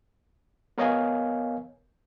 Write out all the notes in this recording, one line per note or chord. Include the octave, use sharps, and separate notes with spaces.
B3 A#4 C#5 D#5 F5 G#5